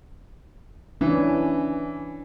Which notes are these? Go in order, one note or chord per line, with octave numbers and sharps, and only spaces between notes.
E3 C#4 D4